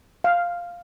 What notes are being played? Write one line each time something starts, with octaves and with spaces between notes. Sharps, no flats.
F5